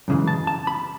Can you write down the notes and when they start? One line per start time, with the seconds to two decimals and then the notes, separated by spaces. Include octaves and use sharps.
0.08 F#2 C#3 E3 G#3
0.28 A5
0.47 A5
0.67 B5